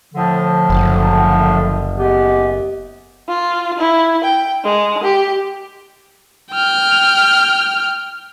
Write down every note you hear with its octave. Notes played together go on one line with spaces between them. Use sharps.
A2 D3 F3
F#1
G#3 B3 G4
F4
E4
G5
G#3
G4
G5 F6